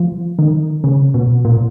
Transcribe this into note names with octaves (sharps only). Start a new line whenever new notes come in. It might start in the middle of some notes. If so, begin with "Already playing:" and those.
Already playing: F3
D#3
C#3
B2
A#2